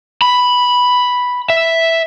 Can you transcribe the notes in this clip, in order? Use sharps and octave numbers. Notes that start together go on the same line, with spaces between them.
B5
E5